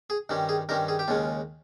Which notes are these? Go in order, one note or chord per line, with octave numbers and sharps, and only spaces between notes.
G#4
G2 D#3 G3 C#4
G#4
G2 D#3 G3 C#4 A#4
G#4
G4
D#2 C#3 G#3 C#4 F4